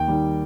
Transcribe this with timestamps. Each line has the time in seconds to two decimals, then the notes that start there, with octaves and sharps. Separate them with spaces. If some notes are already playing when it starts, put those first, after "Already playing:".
Already playing: D#2 G5
0.08 D#3 G3